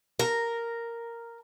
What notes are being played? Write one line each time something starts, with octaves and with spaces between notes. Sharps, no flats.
A#4